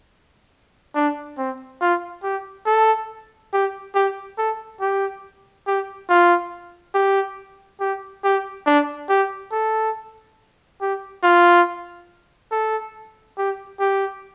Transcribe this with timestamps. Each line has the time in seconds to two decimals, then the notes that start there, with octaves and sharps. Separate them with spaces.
0.95 D4
1.38 C4
1.81 F4
2.23 G4
2.66 A4
3.53 G4
3.95 G4
4.38 A4
4.81 G4
5.67 G4
6.09 F4
6.94 G4
7.80 G4
8.24 G4
8.66 D4
9.09 G4
9.52 A4
10.81 G4
11.23 F4
12.51 A4
13.38 G4
13.80 G4